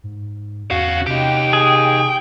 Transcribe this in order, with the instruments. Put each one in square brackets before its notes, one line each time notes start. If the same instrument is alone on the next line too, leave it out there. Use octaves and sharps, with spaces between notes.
[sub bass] G#2
[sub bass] E2 [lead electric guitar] C#4 F5 [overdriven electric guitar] F#4
[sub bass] C3 [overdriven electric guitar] D#4 G4 [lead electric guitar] G5
[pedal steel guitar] G#4